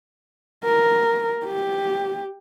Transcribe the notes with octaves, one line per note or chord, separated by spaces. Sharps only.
A#4
G4